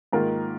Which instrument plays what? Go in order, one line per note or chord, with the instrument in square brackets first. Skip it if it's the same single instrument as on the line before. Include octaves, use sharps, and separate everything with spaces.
[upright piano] G#2 D#3 A#3 F4 A#4